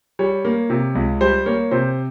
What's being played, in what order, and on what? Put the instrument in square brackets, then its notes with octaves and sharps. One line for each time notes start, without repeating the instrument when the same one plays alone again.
[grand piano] G3 C#5
A#3
C3
C#2
G3 C5
A#3 C#5
C3 C5